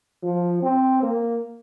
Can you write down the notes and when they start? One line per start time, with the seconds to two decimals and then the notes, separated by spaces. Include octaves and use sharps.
0.23 F3
0.63 C4
1.03 A#3